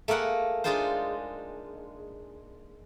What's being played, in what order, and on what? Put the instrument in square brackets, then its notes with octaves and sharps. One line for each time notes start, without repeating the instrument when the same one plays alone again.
[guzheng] A3 A#3 G#4 A#4 F#5
G#3 D4 D#4 F4 G#4 C5